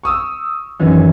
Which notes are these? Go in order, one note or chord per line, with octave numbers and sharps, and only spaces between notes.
C#6 D#6 E6
F#2 D#3 E3